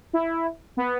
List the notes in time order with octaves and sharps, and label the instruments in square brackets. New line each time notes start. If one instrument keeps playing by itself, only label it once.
[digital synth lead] E4
B3